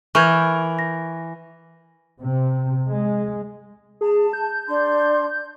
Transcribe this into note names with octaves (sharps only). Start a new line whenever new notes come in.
E3 A#4 C#6 G6 G#6
A#6
C3
G#3
G#4 A5
G6
D4 C6